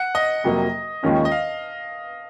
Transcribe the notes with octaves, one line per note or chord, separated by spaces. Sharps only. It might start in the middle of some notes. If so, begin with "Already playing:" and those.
Already playing: F#5
D#5
F2 C3 F#3 A#3
D#2 D#3 G#3 C#4 F4
D#5
F5